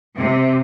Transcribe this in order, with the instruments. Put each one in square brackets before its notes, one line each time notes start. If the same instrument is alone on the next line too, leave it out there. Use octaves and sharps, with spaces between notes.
[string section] C3